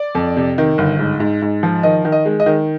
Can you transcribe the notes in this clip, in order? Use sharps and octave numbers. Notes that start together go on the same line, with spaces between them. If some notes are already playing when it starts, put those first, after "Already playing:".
Already playing: D5
F2
C3
D#3
G1
G#2
G#2
G#2
F3
D#3 D#5
D#3
D#5
G#3
D#5
D#3